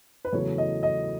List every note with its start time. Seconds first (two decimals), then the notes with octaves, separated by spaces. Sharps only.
0.25 B4
0.33 E2 C#3 F#3 A3 C#5
0.58 D#5
0.83 D#5